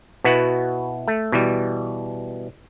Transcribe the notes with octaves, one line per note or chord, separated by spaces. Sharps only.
B2 B3 E4 F#4 F#5
A3
B2 E3 G3